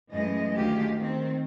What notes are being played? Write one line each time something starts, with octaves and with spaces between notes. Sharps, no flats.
F#2 E3 G#3 A3 D#5
D2 D#3 G#3 G4 F5
D#3 C4